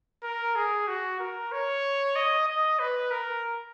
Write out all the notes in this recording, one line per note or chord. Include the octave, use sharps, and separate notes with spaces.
A#4
G#4
F#4
A#4
C#5
D#5
D#5
B4
A#4